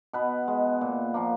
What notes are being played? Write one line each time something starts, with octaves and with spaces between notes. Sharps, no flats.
B2 B3 B4
G#3
A#2
F3 A#3